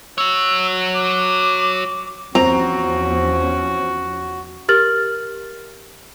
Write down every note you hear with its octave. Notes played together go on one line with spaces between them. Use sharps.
F#4 C#5 E6
D6
E2 F3 C4 C#4 F#4 A#5
G4 A#4 F6 A6 F#7